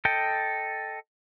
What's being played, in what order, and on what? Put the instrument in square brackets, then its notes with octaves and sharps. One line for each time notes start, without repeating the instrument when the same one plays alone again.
[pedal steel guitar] A4 D#5 G5